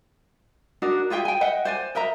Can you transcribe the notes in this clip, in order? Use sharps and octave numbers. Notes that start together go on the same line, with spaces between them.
D4 D#4 F#4 A#4
F4 G#4 E5 G5
G5 G#5
D#5 E5 F#5 G5
C5 D5 G#5
A#4 D#5 E5 A#5